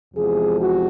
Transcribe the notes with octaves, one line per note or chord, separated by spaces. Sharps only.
E2 C3 F3 G#3 G#4
F#4